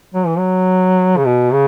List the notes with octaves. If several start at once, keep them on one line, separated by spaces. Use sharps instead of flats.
F#3
E3
F#3
C#3
B2
C#3